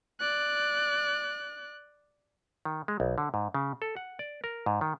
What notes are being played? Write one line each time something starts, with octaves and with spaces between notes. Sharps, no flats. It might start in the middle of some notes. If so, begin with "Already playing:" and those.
D5 F#6
D#3
G#3
B1
D3
G#2
C#3
A4
F#5
D5
A#4
G#2
D#3